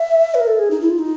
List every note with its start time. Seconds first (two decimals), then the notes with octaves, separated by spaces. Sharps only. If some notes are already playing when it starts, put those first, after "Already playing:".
Already playing: E5
0.35 B4
0.40 A#4
0.47 A4
0.59 G#4
0.71 D#4
0.81 E4
0.90 F4
0.99 D#4